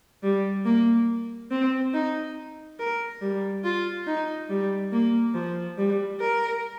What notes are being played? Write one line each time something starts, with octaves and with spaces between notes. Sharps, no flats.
G3
A#3
C4
D#4
A#4
G3
F4
D#4
G3
A#3
F3
G3
A#4